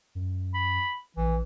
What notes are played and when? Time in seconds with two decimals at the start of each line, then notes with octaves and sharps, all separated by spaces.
0.15 F#2
0.54 B5
1.16 A#1 E3